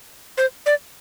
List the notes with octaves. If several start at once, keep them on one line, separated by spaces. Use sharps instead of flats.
C5
D5